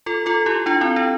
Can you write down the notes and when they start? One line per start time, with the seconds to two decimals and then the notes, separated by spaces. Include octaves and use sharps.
0.06 F4 A4
0.26 F4 A4
0.46 E4 G4
0.66 D4 F4
0.81 C4 E4
0.96 D4